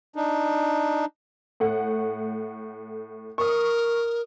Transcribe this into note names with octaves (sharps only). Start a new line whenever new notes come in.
D4 D#4
A2 A3 F#5
A#4 C#6 D#6